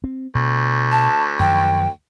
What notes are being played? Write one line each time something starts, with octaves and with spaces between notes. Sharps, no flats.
C4
D2 B2
A5
F#2 D#3 F3 G5